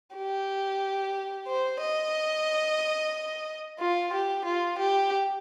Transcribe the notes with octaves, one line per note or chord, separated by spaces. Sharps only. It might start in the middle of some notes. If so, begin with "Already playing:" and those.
G4
C5
D#5
F4
G4
F4
G4